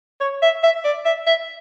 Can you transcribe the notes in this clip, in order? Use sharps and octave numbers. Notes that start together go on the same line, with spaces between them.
C#5
E5
E5
D5
E5
E5